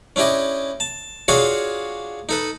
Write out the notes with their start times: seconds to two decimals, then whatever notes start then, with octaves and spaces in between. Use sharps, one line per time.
0.16 C#4 D4 E4 G4 D#5
0.80 A5
1.28 D4 F4 F#4 G#4 C#5 F5
2.29 D#4 A4 B4